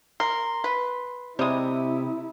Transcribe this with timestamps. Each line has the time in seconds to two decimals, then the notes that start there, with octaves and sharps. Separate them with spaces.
0.20 A#4 C6
0.64 B4
1.39 C3 G3 G#3 E4 D#6